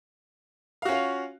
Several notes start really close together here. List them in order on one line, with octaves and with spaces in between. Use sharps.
F5 F#4 C#4 F4